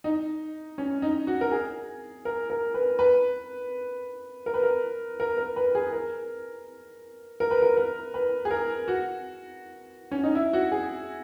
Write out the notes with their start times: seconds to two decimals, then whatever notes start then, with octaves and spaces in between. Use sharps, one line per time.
0.04 D#4
0.78 C#4
1.02 D#4
1.27 F#4
1.41 A#4
1.52 G#4
2.25 A#4
2.50 A#4
2.74 B4
2.99 B4
4.46 A#4
4.54 B4
4.63 A#4
5.20 A#4
5.38 A#4
5.56 B4
5.75 G#4
5.93 A#4
7.40 A#4
7.51 B4
7.62 A#4
7.77 A#4
8.14 B4
8.45 G#4
8.51 A#4
8.88 F#4
10.11 C#4
10.23 D#4
10.35 E4
10.53 F#4
10.72 G#4